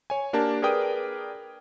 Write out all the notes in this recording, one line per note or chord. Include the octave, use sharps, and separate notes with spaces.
C#5 G#5
A#3 D4 G4 A#4 A5
G#4 A#4 B4 D5 G5 D#6